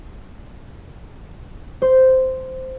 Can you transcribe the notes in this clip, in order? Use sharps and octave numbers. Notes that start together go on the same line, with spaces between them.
C5